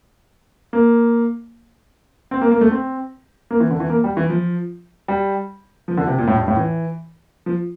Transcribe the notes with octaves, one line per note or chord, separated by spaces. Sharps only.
A#3
C4
A#3
A#3
A3
C4
A#3
E3
D3
E3
A#3
G3
E3
F3
G3
F3
D3
C3
A#2
A2
G2
A2
E3
F3